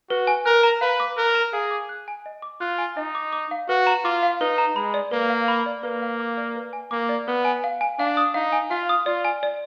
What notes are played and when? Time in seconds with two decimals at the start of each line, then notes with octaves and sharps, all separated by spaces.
0.10 F#4 B4
0.27 G#5
0.46 A#4 F#6
0.63 A#5
0.81 B4 F5
1.00 D6
1.18 A#4 F#6
1.35 A#5
1.53 G#4 F5
1.71 D6
1.89 F#6
2.08 G#5
2.26 D#5
2.42 D6
2.61 F4 F#6
2.78 G#5
2.97 D#4 D#5
3.15 D6
3.33 D6
3.51 F5
3.69 F#4 B4
3.87 A#5
4.04 F4 D6
4.23 F5
4.41 D#4 B4
4.58 A#5
4.76 G#3 B5
4.94 D5
5.11 A#3 B4
5.30 F5
5.48 B5
5.66 D5
5.83 A#3 B4
6.02 F5
6.20 D6
6.37 D5
6.56 B4
6.73 G#5
6.91 A#3 D6
7.09 D5
7.28 B3 B4
7.45 G#5
7.64 F5
7.81 G#5
7.99 D4 F5
8.17 D#6
8.34 D#4 F5
8.52 G#5
8.71 F4 F5
8.89 D#6
9.06 F4 D5
9.25 G#5
9.43 D5